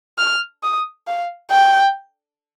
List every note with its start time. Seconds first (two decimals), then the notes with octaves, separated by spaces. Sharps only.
0.18 F6
0.63 D#6
1.07 F5
1.51 G5